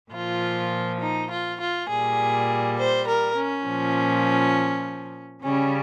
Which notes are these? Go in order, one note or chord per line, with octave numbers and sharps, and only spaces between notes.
A#2 F3 F4
D#4
F4
F4
A#2 G3 G#4
C5
A#4
C#4
A#2 F3
C#3 G3 C#4